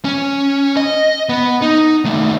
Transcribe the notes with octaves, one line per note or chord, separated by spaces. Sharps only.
C#4
D#5
B3
D#4
D#2 A3